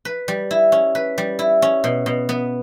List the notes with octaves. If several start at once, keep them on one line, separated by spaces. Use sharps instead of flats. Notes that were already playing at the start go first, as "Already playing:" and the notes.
B4
G3
E4
C#4
B4
G3
E4
C#4
B2
B2
B3